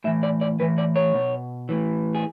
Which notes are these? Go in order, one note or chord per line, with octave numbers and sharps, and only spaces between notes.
A2 E3 E5
D5
D5
A2 E3 B4
D5
C#5
B2
A2 E3
G#4